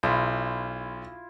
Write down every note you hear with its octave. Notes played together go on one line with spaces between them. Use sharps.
B1 E4 F4